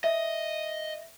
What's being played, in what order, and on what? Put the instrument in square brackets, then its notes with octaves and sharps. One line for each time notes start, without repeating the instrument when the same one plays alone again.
[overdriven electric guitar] D#5 [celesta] E5